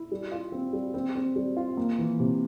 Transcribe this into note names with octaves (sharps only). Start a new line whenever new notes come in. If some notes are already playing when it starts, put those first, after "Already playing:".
Already playing: E4
G3
F4
C4
G3
C4
C4
G3
F4
A#3
E3
C3